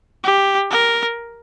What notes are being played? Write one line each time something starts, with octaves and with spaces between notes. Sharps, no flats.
G4
A#4